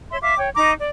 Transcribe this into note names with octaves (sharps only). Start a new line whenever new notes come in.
C#5 E5 C6
E5 F5 D6
C#5 G5
D#4 D#5 A#5 D6
D5